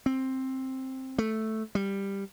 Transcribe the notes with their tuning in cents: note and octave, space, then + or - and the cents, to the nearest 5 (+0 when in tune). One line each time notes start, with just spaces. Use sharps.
C4 +10
A3 +0
G3 +10